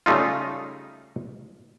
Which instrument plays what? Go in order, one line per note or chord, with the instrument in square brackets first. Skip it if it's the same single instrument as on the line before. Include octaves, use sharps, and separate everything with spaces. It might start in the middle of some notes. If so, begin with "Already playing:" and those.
[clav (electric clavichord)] C#3 G3 A3 D#4 F4